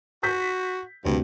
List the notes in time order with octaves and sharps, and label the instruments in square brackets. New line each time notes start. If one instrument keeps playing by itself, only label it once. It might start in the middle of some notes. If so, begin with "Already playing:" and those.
[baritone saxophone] F#4 [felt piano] G6 B6
[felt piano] D2 C3 [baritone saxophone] G2